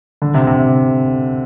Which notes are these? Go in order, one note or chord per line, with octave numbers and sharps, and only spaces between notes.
D3
C3
C3